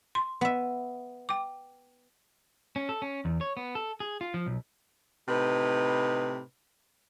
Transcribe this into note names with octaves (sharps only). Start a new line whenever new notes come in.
C6
B3 E5
G5 D6
C#4
A4
C#4
E2
C#5
B3
A4
G#4
F4
F3
B1
A2 C3 D#4 B4